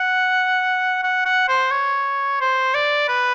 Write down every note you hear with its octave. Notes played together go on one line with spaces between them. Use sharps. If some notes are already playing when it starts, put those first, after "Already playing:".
Already playing: F#5
F#5
F#5
C5
C#5
C5
D5
B4